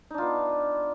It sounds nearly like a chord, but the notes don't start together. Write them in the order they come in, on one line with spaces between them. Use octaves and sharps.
D#4 D4 F4 B3